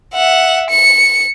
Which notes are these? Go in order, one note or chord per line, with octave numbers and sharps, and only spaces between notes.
E5 F#5
C#7